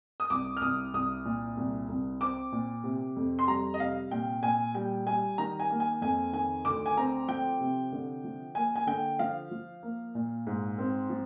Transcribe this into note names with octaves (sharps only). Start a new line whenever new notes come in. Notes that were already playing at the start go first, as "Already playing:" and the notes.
D#6
C2 D6
F6
C2 D#6
C2 D#6
A#2
C2
C2
C4 D6
A#2
C3
F2
C6
G3 A#5
D#5
C3 F5
A#2 G5
A#2 G#5
G3 G5
G3 G#5
D#3 A#5
G#5
A#3
G#5
F2 G#5
D#3 G#5
D2 D6
G#5
C4 A#5
F3 G5
C3
D3
F3
A#3 G#5
G#5
D3 G5
F3 F5
F3
A#3
A#2
G#2
C4
F3